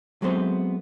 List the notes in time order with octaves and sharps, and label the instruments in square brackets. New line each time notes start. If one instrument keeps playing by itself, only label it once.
[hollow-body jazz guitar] F#3 G#3 A3 B3 C4 C5